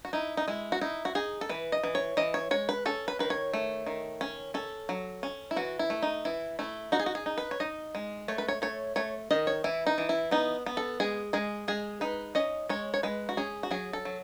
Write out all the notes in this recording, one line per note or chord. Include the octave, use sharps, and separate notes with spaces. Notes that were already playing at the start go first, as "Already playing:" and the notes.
F#4
D#4 E4
D#4
G#3 E4
F#4
D#4 E4
F#4
D#4 G#4
A4
E3 B4
D#5
E3
C#5
E3 D#5
C#5
G#3 C#5
B4
C#4 A4
B4
D#3 B4
C#5
A3
D#3
C#4
C#4 A4
F#3
C#4
E4
E3 F#4
E4
A3
D#4
E3 E4
A3 E4
D#4 F#4
G#4
F#4
G#4
D#4
B4
C#5
D#4 D#5
G#3
A3 C#5
B4
C#5
A3 C#5
A3 C#5
D#3 D#5
C#5
E3 E4
D#4
E3
E4
B3 D#4
B3
A4
G#3 G#4
G#3 G#4
G#3 G#4
D#4 B4
C#4 D#5
G#3 C#5
C#5
G#3 B4
F#4
C#4 G#4
F#4
F#3 G#4
A4
F#3